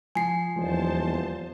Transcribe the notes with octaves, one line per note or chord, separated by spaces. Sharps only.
F3 G#5 C7
D#1 E2 F3 C5 A5